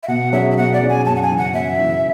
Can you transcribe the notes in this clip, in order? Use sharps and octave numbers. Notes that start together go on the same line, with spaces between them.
E5
B2 F#5
F#3 C#4 G#4 E5
E5
B2 F#5
D5
F#3 C#4 G#4
G#5
F#2 A5
F#5
G#5
C#3 E3
F#5
F#2 E5
C#3 E3